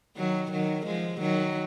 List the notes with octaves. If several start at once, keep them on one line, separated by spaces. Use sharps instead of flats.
D#3 F#3
D#3 F#3
F3 G#3
D#3 F#3